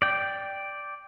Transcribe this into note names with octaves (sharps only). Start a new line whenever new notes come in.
D5 G5